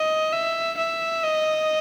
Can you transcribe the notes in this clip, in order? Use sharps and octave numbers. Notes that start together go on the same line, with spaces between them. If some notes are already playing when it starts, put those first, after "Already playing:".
Already playing: D#5
E5
E5
D#5